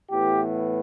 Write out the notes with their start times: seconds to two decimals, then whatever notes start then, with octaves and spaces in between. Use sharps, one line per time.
0.10 A2 E3 B3 G4